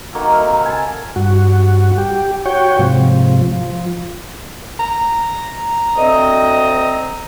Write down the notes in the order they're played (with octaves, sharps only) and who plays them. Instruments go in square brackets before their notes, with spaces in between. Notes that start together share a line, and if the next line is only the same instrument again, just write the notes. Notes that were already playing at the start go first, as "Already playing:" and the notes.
[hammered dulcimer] D#3 A#3 F#4 A4
A#4 E5 F5 B5
C3
G#5 A5
[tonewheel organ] G2 F#4
G4
F#4 C#5 G5
G#2 C3 F3
F3
[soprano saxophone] A#5
[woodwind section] D2 C4 D#5